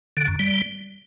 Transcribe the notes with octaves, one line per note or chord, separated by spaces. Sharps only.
D3
F#2
G3